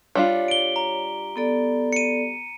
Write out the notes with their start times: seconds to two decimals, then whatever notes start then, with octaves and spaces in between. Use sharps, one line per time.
0.15 G3 D4 F4 C#5
0.48 D7 G7
0.76 A#5
1.36 B3 A4 D5
1.93 C#7 D#7